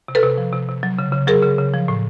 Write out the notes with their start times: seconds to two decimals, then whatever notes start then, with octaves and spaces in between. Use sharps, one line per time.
0.08 C3
0.15 A4 B4
0.23 C3
0.38 F3
0.53 C3
0.68 C3
0.83 F#3
0.99 C#3
1.12 C#3
1.27 F#3 G#4 A#4
1.43 C#3
1.58 C#3
1.74 F3
1.88 A2